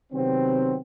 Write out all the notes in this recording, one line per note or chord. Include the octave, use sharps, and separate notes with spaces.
C3 D#3 F#3 B3 C4